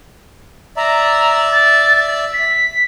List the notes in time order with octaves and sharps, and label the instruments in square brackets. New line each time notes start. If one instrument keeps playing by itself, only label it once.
[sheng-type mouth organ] D5 E5 [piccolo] A#5
[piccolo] A6
B6